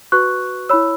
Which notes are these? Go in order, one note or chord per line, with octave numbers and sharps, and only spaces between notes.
F#4 B4 C#6 F#6
E4 C#5 B5 E6